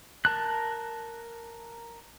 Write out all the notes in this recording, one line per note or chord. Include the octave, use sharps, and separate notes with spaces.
A#4 A5 F#6